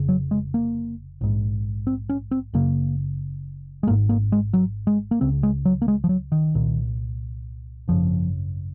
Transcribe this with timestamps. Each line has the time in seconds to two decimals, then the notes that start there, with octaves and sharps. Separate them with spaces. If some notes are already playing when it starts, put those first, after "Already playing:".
Already playing: F1 C#3
0.09 F#3
0.31 G#3
0.54 A#3
1.21 A#1 G#2
1.87 C4
2.10 C#4
2.31 C4
2.54 F#1 F#2 C#3 A#3
3.83 G#3
3.87 G#1 A#3
3.90 G#2
4.09 A#3
4.32 G#3
4.53 F#3
4.87 G#3
5.11 A#3
5.21 C#2 C#3 C4
5.43 G#3
5.65 F#3
5.82 A#3
5.88 G#3
6.04 F3
6.09 F#3
6.32 D#3
6.55 C2 A#2
7.88 G#1 F#2 C#3 F3